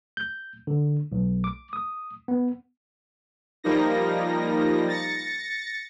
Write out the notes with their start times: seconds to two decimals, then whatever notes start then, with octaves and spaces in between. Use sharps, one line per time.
0.17 G6
0.67 D3
1.12 B1
1.44 D6
1.73 D#6
2.28 B3
3.64 F3 G3 A#3 D#4 A#6
4.88 A6 A#6 C#7